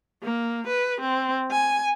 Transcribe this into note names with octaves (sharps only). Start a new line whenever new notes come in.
A#3
B4
C4
G#5